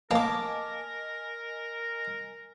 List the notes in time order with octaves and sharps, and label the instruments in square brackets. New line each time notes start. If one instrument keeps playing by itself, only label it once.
[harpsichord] A#3 [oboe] A#4 [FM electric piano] D#5 G#5 [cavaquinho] A5 D6